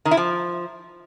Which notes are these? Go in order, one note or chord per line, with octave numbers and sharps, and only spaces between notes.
D#3
E4
F3